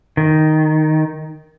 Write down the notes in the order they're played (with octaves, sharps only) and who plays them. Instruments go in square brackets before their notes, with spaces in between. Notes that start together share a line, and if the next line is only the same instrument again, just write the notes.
[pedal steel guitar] D#3